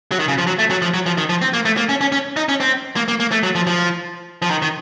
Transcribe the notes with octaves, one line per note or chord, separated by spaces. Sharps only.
F#3
D#3
C#3
F3
F#3
A3
F#3
F3
F#3
F3
D#3
F3
C4
A#3
A3
A#3
C#4
C#4
C#4
D#4
C#4
C4
A#3
A#3
A#3
A3
F#3
F3
F3
F3
D#3
D#3